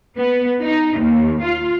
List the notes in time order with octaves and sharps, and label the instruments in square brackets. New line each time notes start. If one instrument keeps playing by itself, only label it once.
[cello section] B3
D#4
D#2
F4